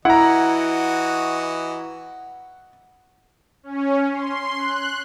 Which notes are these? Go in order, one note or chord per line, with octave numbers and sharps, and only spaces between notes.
E3 E4 F#4 D#5 F#5 A#5
C#4
C6
F#6